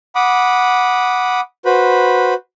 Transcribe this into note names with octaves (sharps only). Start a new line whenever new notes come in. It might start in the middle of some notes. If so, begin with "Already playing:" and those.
F#5 B5 D6 D#6
F#4 B4 C5 B5